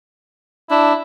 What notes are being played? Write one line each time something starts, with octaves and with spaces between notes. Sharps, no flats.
D4 E4